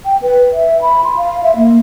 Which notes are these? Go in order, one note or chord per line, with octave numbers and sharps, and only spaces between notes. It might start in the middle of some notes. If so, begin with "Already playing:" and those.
G5
B4
E5
B5
C6
F5
E5
A#3